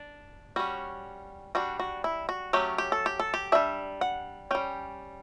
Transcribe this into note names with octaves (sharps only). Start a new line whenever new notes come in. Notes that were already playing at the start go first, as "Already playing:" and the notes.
Already playing: D4
G3 C#4 F#4
G3 D4 F#4
F#4
E4
F#4
F#3 A3 C#4 G4
G4
A4
G4
A4
G4
G3 D4 E5
F#5
G3 C#4 G5